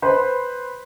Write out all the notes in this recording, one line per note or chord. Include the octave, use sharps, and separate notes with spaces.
B4 C5 B5 C6